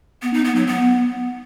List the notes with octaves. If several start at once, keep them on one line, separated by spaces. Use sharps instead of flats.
B3
D#4
B3
F#3
B3